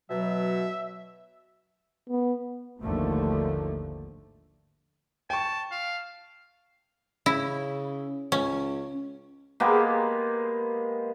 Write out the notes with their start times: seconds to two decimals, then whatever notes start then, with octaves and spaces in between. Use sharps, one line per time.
0.10 B2 F#3 E5
2.09 B3
2.81 G#1 D#2 D3 F3 A3
5.30 G5 A5 C#6
5.71 F5
7.26 C#3 E4
8.32 C#2 C#4
9.60 G#3 A#3 B3 G4